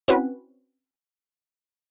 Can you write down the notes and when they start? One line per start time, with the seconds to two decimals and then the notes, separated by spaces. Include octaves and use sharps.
0.08 C4 C#4 E4 F#4 B4